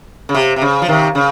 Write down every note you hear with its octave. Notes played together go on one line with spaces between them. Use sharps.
C#3
C3
C3
C#3
F3
C3 D#3
C#3